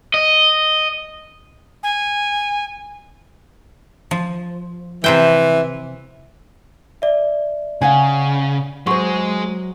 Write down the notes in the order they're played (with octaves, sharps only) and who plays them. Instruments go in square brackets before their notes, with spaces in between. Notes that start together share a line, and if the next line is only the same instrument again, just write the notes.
[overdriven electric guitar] D#5
[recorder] G#5
[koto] F3
[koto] C3 C5 G5 [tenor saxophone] E3
[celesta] D5 E5
[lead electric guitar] C#3 [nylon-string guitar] F5 F#5 G#5
[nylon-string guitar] F#3 C5 [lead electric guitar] G#3 G#4 [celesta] C6 C#6